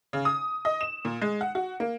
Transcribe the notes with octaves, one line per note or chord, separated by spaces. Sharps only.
C#3
D#6
D#5
E7
A#2
G#3
F#5
F#4
A#3